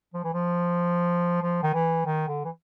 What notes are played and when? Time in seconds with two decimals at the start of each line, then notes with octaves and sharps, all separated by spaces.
0.14 F3
0.24 E3
0.33 F3
1.42 F3
1.63 D#3
1.74 E3
2.06 D#3
2.28 D3
2.44 E3